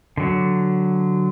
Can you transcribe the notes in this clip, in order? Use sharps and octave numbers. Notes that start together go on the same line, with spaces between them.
D3 F#3